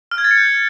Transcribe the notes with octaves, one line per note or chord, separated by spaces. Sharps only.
F6
G#6
A6
C#7
G6